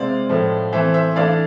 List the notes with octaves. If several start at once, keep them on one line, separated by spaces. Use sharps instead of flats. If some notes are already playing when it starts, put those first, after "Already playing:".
Already playing: C3 G#3 C4 D5 F5
A2 F3 A3
E3 A3 C4 C5 E5
C5 E5
E3 A3 D4 D5 F5